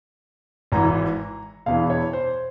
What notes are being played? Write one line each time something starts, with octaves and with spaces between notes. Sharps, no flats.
G#1 G#2 E3 A#5
E1 E2 E3 F5
C#5
C5